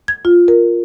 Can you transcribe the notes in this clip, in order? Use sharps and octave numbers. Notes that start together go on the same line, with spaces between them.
G#6
F4
A#4